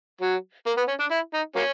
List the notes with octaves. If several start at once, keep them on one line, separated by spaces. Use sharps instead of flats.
F#3
A#3
B3
C#4
D4
E4
D#4
F#3 A#3 C#4